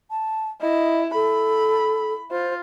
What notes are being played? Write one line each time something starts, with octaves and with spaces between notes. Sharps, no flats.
A5
E4 D#5
A4 B5
F4 C5